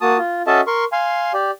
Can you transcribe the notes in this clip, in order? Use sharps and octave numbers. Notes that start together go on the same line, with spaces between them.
A#3 F#4 A5 D#6
F4
C#4 F#4 A4 D#5 E5 A5
A#4 C6 C#6
F5 G#5 C6
G4 D5